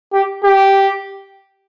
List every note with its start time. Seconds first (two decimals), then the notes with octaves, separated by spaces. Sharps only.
0.13 G4
0.44 G4